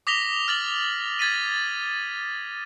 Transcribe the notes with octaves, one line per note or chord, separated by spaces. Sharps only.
D6 D#6 A#6 B6 F7 G7
F6 A6 F#7
G#6 A6 B6 D#7